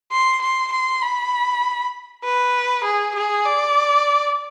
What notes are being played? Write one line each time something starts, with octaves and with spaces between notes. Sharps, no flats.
C6
C6
C6
B5
B4
G#4
G#4
D5